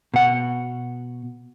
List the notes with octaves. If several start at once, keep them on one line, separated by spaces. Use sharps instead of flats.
B2 F#5